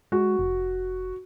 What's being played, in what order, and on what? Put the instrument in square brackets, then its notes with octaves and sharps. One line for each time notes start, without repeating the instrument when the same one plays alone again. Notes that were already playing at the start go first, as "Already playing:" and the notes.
[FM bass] G#3 [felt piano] F#4
[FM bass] F1